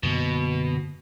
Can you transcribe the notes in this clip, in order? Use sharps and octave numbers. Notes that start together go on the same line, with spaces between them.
F#2 B2 D3 A#3